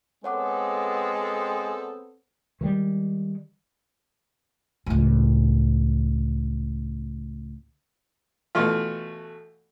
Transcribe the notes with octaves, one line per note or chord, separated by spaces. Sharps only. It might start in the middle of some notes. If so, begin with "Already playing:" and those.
G#3 B3 C4 A4 C#5 F#5 D6
D#3 E3 G3 G#3
C#2 A2
B2 E3 A3 F4